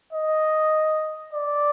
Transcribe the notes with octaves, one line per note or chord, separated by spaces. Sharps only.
D#5
D5